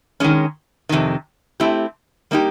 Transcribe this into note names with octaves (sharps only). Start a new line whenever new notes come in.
D#3 G#3 C#4
F2 C3 D#3
A3 C4 E4 G4
G3 A#3 D#4 G4